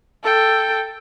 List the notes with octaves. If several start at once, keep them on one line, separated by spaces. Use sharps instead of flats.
A4 G5